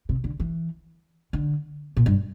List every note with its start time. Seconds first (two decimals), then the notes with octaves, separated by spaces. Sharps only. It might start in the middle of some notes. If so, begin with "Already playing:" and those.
0.09 C3
0.24 D3
0.40 E3
1.33 D3
1.97 A#2
2.06 G2